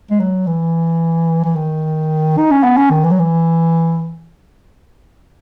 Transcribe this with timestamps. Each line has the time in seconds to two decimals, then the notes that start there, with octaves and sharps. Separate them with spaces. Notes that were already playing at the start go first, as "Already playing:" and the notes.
0.11 G#3
0.20 F#3
0.47 E3
1.44 E3
1.55 D#3
2.38 D#4
2.51 C#4
2.63 B3
2.77 C#4
2.90 D#3
3.04 E3
3.11 F#3
3.19 E3